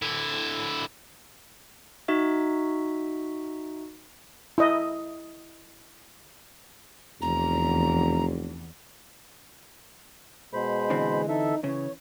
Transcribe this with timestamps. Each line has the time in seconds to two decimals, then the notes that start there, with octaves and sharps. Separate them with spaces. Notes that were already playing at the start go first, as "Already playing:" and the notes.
0.02 D3 E4
2.08 D#4 F#4 E5
4.58 E4 D#5
7.22 F1 E2 A#5
10.53 B2 G#3 C5 B5
10.90 D3 E3 C4
11.29 D#4 A4 E5
11.64 C#3 E3 C#5